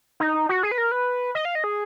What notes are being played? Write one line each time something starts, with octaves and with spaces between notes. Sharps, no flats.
D#4
F#4
G#4
B4
A#4
B4
D#5
F5
D#5
G#4